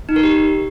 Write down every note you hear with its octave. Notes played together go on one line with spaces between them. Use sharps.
D#4
A#4
G4